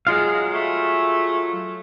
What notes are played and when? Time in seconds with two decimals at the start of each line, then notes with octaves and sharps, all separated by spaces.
0.07 F#3 G#3 F4 F5
0.52 G#3 A3